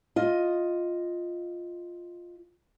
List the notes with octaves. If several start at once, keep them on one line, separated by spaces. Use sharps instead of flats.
F4 D#5